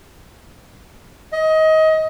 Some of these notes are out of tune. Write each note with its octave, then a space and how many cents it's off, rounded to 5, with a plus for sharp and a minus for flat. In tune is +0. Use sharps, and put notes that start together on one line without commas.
D#5 +25